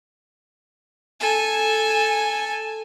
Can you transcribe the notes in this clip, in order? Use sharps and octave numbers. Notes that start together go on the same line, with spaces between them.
A4 G#5